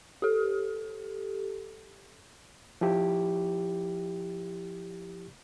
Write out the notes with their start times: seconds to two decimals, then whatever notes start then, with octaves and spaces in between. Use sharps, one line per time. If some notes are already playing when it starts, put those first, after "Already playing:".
0.22 G4 A4
2.81 F3 E4 G4